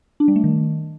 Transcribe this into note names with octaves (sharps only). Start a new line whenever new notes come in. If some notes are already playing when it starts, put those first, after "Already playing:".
D4
G3
A3
D#3